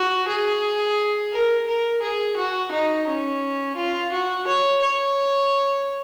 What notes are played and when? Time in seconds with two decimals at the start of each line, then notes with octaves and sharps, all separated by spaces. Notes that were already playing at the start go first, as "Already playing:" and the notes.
Already playing: F#4
0.28 G#4
1.32 A#4
1.67 A#4
2.02 G#4
2.37 F#4
2.72 D#4
3.07 C#4
3.76 F4
4.12 F#4
4.47 C#5
4.81 C#5